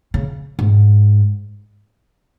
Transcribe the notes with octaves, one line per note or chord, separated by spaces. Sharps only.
C#3
G#2